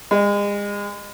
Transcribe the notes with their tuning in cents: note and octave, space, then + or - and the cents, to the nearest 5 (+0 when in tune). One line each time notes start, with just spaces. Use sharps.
G#3 -35